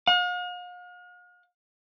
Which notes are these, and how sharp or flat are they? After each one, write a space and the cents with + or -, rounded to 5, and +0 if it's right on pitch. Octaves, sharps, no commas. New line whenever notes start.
F5 +45